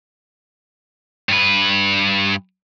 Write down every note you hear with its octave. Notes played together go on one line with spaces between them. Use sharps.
G2 B4